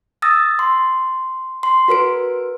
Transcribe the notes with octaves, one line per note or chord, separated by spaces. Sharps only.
D#6 E6 A6 A#6
C6
C6
F#4 A#4 B4 D7